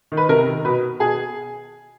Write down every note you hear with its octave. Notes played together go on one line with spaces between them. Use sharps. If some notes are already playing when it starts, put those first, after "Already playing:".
D#3
B4
C3 A#4
D#3
B2 B4
B2 G#4